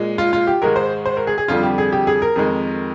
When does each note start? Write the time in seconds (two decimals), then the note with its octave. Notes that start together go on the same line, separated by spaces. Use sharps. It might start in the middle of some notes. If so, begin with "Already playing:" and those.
Already playing: A#2 G#3
0.18 F4
0.33 F4
0.47 G4
0.62 G#2 D#3 G#3 A#4
0.76 C5
1.06 C5
1.17 A#4
1.27 G#4
1.38 G#4
1.48 F2 D3 G3 F4
1.63 G4
1.78 G#4
1.92 G4
2.07 G#4
2.22 A#4
2.36 F2 D#3 G#3